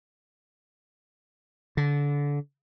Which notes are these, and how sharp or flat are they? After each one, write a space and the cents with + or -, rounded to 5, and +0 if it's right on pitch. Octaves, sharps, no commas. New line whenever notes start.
D3 -25